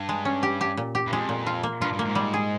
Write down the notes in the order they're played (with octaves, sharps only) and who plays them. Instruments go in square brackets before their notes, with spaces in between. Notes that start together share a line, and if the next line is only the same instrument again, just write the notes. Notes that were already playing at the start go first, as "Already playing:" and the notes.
Already playing: [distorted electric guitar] G2
[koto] G#3
C#4
G4
G4
A#2
G4
[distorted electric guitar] G2
[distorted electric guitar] F2 [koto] G#3
[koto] A#2
F4
A#3
[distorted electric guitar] G2 [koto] F4
[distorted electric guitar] G2
[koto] A#3
[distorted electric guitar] G#2
[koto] G3
G#4